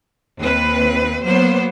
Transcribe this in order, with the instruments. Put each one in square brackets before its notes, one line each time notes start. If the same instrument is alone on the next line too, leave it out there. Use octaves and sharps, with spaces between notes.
[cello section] D#2 C4 B4
F#3 A#3 B3 C5